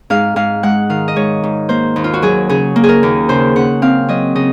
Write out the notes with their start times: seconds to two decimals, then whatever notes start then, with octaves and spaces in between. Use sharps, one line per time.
0.10 G#2 F5
0.36 G#2 F5
0.63 G#3 F#5
0.89 D#3 F5
1.08 D#5
1.16 G#2 C#5
1.43 G#2
1.69 A#3 C5
1.96 D#2
2.04 F4
2.14 F#4
2.22 F#3 G#4
2.49 C#3 G#4
2.76 A#3
2.84 G#4
2.89 A#4
3.03 D#2
3.29 C#3 C5
3.56 C#3 F#5
3.82 C4 F5
4.09 F#3 D#5
4.35 C#3 D#5